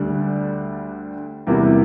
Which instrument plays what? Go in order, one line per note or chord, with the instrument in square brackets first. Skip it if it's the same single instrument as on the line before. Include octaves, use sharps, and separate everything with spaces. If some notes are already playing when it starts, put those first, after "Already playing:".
Already playing: [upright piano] D2 D3 G3 D4
E2 C3 G3 A#3 E4